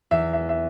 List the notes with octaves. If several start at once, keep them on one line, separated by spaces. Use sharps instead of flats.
E2 E5
E5
E5